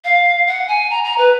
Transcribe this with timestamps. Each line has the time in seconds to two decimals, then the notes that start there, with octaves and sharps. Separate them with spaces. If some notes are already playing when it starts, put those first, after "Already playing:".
0.04 F5
0.47 F#5
0.68 G#5
0.90 A#5
1.04 A#5
1.18 B4